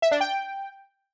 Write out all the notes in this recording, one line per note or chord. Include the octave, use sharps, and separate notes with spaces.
E5
D4
G5